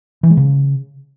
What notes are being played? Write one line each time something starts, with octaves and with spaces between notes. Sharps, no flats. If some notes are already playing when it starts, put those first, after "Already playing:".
E3
G#3
C#3